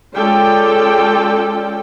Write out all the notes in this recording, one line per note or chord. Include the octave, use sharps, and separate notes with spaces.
G#3 C#4 F4 A4 D5 G5